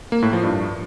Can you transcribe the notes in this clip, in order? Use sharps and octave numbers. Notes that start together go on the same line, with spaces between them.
A#3
A2
F3
G2